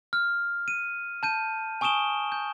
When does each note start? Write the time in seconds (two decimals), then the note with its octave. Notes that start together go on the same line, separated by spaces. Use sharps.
0.13 F6
0.68 D#7
1.23 A5 G6 D#7
1.81 G#5 C#6 D#6 D7 E7 G7
2.32 G6